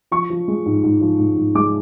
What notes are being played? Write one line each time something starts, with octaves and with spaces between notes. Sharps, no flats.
F3 C#6
F3
G#3
G#2
G#2
F3
G#2
G#2
G#3 D6